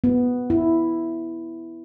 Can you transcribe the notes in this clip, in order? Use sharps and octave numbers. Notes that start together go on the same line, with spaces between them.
B3
E4